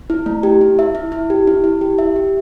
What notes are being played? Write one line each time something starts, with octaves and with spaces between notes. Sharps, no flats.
E4
A3
G4
E4
E5
E4
E4
G4
E4
E4
G4
E5
G4